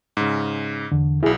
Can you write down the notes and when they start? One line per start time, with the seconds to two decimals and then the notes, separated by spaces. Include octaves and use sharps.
0.17 G#2 C#3
0.92 E2 D3
1.23 B1 B2 E4 G#4